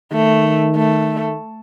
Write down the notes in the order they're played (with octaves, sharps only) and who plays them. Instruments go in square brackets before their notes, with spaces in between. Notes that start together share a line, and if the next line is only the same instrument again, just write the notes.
[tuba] D#3 [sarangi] A3
[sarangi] A3